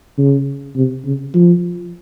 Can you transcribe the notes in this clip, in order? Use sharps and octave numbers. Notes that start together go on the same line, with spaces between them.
C#3
C3
C#3
F3